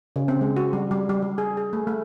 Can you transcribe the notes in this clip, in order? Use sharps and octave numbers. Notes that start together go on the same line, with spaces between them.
C#3
C4
G#3
F#4
G3
G3
G3
G3
G#4
G#4
A3
A3